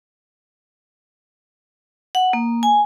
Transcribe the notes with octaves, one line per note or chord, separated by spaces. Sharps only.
F#5
A#3
G#5